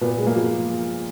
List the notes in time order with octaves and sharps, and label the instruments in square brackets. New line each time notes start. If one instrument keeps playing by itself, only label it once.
[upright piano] A#2 B3
G#3
A#3
F3